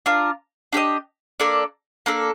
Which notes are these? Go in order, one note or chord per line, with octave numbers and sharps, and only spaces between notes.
D4 F4 A#4
D4 G4 C5 D#5
A#3 D4 A4 D5
A#3 D4 A4